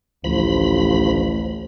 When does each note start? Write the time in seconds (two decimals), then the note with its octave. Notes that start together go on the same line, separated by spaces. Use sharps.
0.24 A1 D2 F3 B5